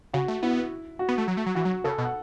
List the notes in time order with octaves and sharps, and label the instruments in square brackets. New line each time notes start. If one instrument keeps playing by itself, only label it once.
[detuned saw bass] C#3 [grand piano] F#4
[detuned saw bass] A3
[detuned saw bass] B3 [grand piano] E4
[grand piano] F#4
[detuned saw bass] B3
A3
F#3
A3
F#3
[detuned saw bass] E3 [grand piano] F#4
[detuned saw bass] F#3
[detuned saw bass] C#3 [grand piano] A4
[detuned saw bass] B2
[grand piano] F#5